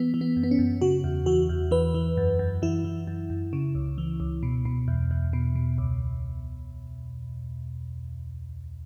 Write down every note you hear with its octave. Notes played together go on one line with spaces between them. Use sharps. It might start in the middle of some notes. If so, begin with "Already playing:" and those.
Already playing: E3 B3
E3
B3
F#2
B3
C#4
F#2
C#3 F#4
E2
E3 F#4
E2
E3 B4
E3
F#2
F#2
E3 E4
E3
F#2
F#2
C#3
C#2
E3
C#2
B2
B2
E2
E2
B2
B2
C#2